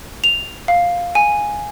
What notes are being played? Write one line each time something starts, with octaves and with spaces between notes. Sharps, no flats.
F7
F5
G#5